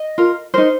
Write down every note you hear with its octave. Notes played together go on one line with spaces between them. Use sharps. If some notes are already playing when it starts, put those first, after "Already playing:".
Already playing: D#5
F4 A#4
D#4 A#4 C5